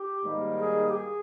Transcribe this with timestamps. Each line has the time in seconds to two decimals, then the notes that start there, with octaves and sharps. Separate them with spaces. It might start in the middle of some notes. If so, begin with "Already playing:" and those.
Already playing: G4
0.24 G#2 D#3 G3 A#3 D#4
0.59 G#4
0.88 G4
0.95 G#4